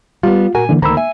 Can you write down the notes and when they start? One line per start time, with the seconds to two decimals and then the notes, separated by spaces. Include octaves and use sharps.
0.23 G3 B3 F4
0.55 A#2 F#4 A#4 G#5
0.69 D3 E3 A#3
0.82 D2 D#3 A#3 A#5 B5 E6
0.97 E5 G#5